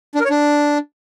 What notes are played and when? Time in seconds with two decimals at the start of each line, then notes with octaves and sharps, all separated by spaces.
0.15 D4
0.20 A#4
0.25 C#5
0.30 D4